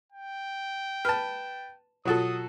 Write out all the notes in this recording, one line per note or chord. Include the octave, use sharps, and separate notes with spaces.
G5
B4 A5 F6
B2 F#3 F4 F#4 A4 D#6 A6